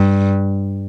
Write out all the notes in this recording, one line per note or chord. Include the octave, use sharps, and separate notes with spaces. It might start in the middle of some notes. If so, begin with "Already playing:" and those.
Already playing: G2